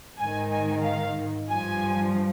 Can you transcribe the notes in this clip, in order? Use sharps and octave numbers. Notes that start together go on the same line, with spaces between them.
G#2 D#3 G#5
G#5
F5
G2 F3 G#5